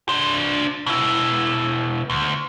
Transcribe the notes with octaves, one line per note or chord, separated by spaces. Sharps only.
D4 C5
B2 E4
D2